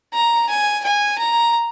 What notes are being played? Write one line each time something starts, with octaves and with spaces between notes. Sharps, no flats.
A#5
G#5
G#5
A#5